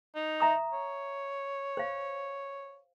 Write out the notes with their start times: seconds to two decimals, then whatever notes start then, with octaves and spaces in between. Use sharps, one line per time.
0.16 D#4
0.40 E5 A#5 D#6
0.73 C#5
1.77 C5 F5